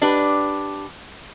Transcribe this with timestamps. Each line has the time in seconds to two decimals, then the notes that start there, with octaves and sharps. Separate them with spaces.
0.02 D4 G4 B4